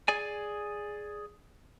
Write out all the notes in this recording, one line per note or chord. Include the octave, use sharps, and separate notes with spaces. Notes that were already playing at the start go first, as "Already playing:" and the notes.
G#4 D5 G#5